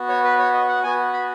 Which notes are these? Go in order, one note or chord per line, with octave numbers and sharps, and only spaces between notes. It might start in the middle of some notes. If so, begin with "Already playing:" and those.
Already playing: B3 F#4
C#5
B4
C#5
D#5
F#5
B3 F#4 G#5
B5